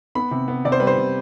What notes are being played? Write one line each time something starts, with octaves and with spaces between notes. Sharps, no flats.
B3 B5
C3
B3
C3 D5
C5
G3 B4
C5
C3